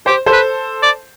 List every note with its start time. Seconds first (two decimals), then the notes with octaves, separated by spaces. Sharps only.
0.06 G4 C5
0.26 A4 C5
0.32 B4
0.82 D5